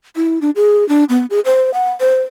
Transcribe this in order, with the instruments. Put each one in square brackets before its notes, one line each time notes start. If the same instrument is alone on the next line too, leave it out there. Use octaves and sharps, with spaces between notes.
[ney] E4
D4
G#4
D4
B3
G#4
C5
F#5
C5